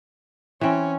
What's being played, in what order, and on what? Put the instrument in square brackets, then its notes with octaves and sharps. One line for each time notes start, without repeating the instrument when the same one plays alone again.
[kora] E3 C4 [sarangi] C#4